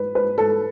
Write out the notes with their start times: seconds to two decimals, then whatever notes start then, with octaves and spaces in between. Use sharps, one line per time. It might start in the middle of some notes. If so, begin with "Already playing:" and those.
Already playing: B4
0.15 B4
0.38 A4